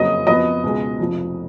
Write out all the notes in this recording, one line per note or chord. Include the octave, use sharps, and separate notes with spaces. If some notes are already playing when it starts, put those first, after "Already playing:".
Already playing: F#1 F2 C#3 F#3 D#5 D#6
F2 F3 B3 D#5 D#6
C#2 B2 G#3
F1 F2 F3